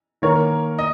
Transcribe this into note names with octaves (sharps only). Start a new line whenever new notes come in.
D#3 A#3 A#4 C#5
D#5